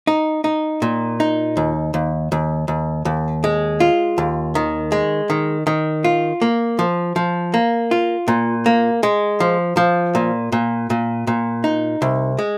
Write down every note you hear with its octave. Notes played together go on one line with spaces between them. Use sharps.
D#4
D#4
A#2
D#4
D#2
D#2
D#2
D#2
D#2
G#3
F4
D#2
D#3
G#3
D#3
D#3
F4
A#3
F3
F3
A#3
F4
A#2
A#3
G#3
F3
F3
A#2
A#2
A#2
A#2
D#4
C2
G#3